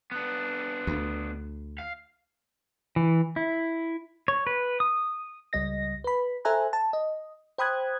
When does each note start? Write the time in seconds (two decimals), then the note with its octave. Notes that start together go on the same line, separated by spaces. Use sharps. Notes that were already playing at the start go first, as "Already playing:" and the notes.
0.11 B3 D4
0.87 D2
1.79 F5
2.96 E3
3.36 E4
4.28 C#5
4.47 B4
4.80 D#6
5.53 C#2 G3 D#5 A#6
6.04 B4 B5
6.45 A4 C5 E5 G#5 A#5 F#6
6.73 A5
6.93 D#5
7.58 C5 G5 B5 D#6 F#6 G#6